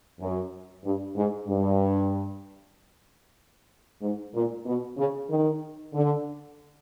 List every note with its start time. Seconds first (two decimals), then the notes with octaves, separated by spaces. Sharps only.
0.21 F#2
0.85 G2
1.16 G#2
1.48 G2
4.02 G#2
4.35 A#2
4.66 B2
4.98 C#3
5.30 D#3
5.94 D3